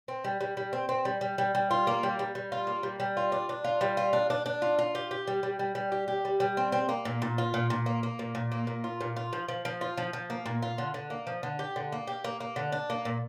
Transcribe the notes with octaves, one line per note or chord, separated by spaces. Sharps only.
C4
G3
G3
G3
C4
C4
G3
G3
G3
G3
F4
A#3
G3
G3
G3
F4
A#3
G3
G3
F4
D4
D4
F4
G3
F4
D4
D4
D4
F4
F4
G4
G4
G3
G3
G3
G3
G4
G4
G3
G3
C4
C4
A#3
A#2
A#2
F4
A#2
A#2
A#3
A#3
A#2
A#2
A#3
A#2
F4
A#2
F4
F3
F3
F3
F4
F3
F3
A#3
A#2
F4
D3
D3
A#3
F3
D3
G4
D3
A#3
G4
A#3
A#3
D3
D4
A#3
A#2